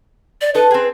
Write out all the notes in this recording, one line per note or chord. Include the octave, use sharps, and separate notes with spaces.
D5
D#4 A4 B4
C4 G#4